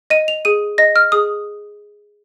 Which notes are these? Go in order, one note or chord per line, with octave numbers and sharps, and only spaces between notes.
D#5 D#7
F7
G#4 D#7
D#5 A#6
F6
G#4 D#6